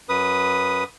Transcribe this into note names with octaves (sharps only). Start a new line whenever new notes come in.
F#2 B4 D#6